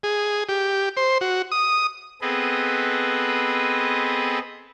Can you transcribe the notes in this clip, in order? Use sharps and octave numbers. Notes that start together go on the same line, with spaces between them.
G#4
G4
C5
F#4
D#6
B3 C4 G#4 A4 B4 D#5